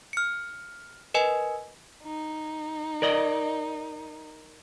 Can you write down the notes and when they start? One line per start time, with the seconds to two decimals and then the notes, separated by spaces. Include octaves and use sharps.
0.13 F6 C#7
1.14 A#4 B4 D#5 G#5
2.04 D#4
3.02 A#4 D5 D#5